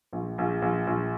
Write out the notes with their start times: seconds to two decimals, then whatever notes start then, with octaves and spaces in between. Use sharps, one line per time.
0.13 A#1
0.38 A#1
0.62 A#1
0.87 A#1